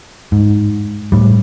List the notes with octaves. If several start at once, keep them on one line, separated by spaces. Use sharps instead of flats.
G#2
A2 G3